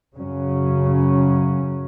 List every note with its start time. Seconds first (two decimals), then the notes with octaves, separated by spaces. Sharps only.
0.16 F#2 C#3 F#3 C#4